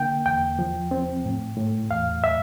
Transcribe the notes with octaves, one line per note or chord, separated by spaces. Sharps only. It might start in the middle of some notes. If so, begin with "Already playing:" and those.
Already playing: D3 A#3 G5
E2 G5
F3
C4
A2
A2
E2 F5
E5